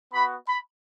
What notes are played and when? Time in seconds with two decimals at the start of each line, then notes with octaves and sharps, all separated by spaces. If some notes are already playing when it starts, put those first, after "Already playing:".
0.13 B3 F#4 B5
0.48 B5